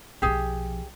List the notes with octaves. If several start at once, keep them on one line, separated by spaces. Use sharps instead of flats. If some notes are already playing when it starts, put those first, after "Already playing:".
B1 F3 G4 G#4